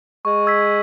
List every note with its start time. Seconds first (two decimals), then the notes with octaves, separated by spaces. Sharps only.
0.25 G#3 C#6
0.47 E6 G#6 B6